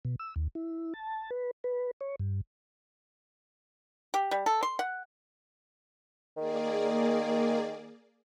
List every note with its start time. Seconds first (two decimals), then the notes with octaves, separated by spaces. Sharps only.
0.05 B2
0.19 E6
0.36 D#2
0.55 E4
0.94 A5
1.31 B4
1.64 B4
2.01 C#5
2.20 G2
4.14 G4
4.31 G3
4.46 A4
4.63 C6
4.79 F#5
6.37 D#3 A#3 G#4 D5